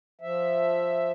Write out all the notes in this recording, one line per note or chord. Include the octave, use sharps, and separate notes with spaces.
F3 E5